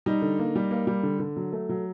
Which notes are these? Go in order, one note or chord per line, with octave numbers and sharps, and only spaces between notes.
G3 D#4
D3
A#3
G3
A#3
G3
D3
D3
F#3
A3
F#3